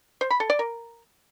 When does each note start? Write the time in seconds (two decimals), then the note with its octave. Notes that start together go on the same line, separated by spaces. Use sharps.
0.21 C5
0.31 B5
0.40 A4
0.50 D5
0.59 A#4